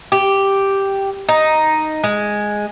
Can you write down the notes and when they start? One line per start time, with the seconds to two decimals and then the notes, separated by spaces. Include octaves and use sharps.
0.12 G4
1.29 D#4
2.04 G#3